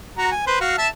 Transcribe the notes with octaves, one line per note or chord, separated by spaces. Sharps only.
F#4 A#5
G#5
B4 C5
F#4 F5
E5 A5